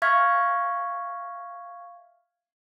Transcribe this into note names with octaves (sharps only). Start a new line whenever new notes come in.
E5 F5 C#6 F6 G#6 B6